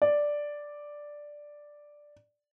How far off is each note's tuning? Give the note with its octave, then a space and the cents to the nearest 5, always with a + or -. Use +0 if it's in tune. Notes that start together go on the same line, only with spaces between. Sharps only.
D5 +0